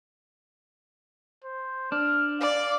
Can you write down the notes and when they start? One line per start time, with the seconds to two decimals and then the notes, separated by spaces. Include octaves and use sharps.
1.44 C5
1.92 D4 F6
2.41 D5 F5